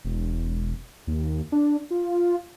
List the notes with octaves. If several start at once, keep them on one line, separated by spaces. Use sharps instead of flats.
E1
D#2
D4
F4